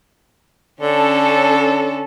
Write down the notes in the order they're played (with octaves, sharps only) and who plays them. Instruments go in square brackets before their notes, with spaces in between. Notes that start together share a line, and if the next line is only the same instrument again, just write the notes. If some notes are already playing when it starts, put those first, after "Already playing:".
[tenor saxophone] D3 [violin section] C#4 A4